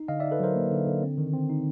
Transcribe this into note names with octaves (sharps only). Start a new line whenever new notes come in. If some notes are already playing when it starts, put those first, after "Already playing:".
Already playing: D#4
D3 D#5 F5
D#4 D5 E5
A4 B4
F#3 A#4 C5
A#3
D3
D3
C4
D#3
C4
D#4